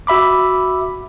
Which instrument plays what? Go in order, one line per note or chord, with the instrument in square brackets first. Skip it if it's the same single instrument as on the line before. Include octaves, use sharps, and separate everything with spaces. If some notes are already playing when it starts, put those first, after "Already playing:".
[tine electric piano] F#4 E5 B5 D6